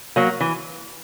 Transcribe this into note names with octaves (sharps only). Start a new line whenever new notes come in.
F#3 A#3
E3